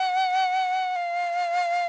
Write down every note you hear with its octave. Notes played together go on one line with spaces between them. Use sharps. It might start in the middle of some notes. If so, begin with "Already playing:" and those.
Already playing: F#5
F5